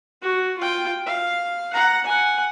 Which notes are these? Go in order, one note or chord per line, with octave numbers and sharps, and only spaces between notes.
F#4
F4 G5
F5
F#5 A#5
F#5 G#5